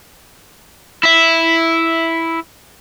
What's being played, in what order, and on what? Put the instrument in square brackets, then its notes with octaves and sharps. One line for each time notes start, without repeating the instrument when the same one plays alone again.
[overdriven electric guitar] E4 E5